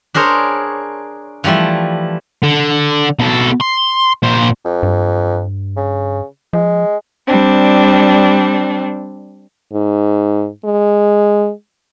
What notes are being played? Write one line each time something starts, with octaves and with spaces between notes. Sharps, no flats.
D4 G#4 A#4 C5 C#5
E3 F3 G3 A3 E4
D3
B2 A4
C6
A#2 C5
F2
G2
C#3
F3 G#3
G3 C4 D4
G#2
G#3